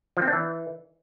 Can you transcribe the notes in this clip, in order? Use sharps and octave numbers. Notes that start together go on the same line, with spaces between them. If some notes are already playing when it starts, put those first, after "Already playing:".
F3
C4
D4
E3